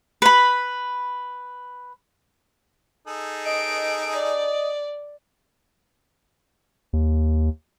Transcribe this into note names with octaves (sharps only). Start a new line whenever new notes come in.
B4 B5
D#4 G#4 A4
D#5 D7
D5
D#2